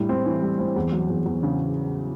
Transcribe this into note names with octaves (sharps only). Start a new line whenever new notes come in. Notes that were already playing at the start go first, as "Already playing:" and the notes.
Already playing: A2 G3
C4
E3
G3
C4
E2
F#3
E2
E2
C#3